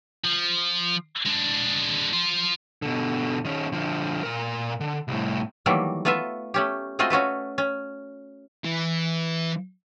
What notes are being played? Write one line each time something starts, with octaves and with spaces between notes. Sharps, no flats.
F3
G#3 D4
F4 C5
B2 D3
D#3 C#4
D3 F3
A#2 A#4
D3
C2 A2
D#3 E3 F#3 G3 A3 A#3
A3 B3 F4 B4 E5
A3 C#4 G4
G#3 A3 C4 F4 F#4 D#5
C#4 F#4 A4 B4
C#4
E3